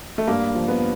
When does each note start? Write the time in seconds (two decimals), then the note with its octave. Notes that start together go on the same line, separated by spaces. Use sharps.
0.18 A3
0.27 G2 A#3
0.55 F3
0.68 B3